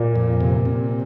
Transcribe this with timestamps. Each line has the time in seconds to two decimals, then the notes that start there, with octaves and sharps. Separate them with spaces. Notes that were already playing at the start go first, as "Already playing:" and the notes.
Already playing: A#2 A#3
0.16 F2
0.41 C3
0.65 C3